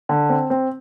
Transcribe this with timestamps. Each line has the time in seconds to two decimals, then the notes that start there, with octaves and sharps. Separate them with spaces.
0.09 D3
0.29 C4
0.50 C4